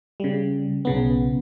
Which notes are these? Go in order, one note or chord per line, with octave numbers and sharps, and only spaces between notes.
C#3 G3
B1 C#3 B3